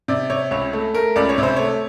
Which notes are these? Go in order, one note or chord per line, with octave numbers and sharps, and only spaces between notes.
C3 D5
C3 C#5
C#2 C#5
A3
A3 A#4
C#2 D5
C#5
C3
C5
A3 C#5